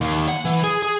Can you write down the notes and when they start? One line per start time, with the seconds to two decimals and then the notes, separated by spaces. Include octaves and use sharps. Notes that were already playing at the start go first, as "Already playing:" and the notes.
0.01 D#2
0.28 F#5
0.45 E3
0.64 G#4
0.82 G#4